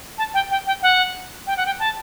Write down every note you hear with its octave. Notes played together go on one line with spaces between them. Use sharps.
A5
G5
G5
G5
F#5
G5
F#5
G5
A5